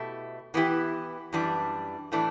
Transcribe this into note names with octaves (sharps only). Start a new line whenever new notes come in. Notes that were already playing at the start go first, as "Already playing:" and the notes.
Already playing: B2 A3 E4 G4
E3 B3 E4 G4
F#2 E3 G3 D4
A2 E3 A3 D4